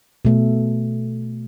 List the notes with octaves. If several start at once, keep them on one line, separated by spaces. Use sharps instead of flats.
B2 A3